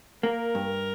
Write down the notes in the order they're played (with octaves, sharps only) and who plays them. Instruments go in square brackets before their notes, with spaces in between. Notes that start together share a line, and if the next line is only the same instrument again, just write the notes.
[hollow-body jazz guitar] A#3 [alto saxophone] A#4
[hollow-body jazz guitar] G2